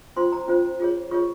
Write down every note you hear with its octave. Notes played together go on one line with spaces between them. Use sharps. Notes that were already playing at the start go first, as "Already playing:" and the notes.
C#4 F4 C5 C6
A#5
C#4 F4 C5
F4 G#4 C#5
F4 G#4 C#5 C#6